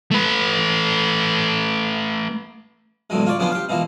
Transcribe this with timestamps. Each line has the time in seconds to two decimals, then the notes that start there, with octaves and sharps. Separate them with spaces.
0.11 A3 B4
3.10 E2 A2 D3 F#3 G#3
3.26 F4 C#5 D5
3.39 C#3 F3 B3 C#4 D4 F4
3.52 G4 F5
3.69 B2 E3 F3 A#3